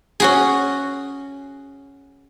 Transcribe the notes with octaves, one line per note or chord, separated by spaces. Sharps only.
C#4 F#4 G#4